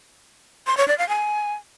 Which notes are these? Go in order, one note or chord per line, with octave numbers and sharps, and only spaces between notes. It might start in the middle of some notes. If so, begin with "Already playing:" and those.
C6
C#5
D5
F5
G#5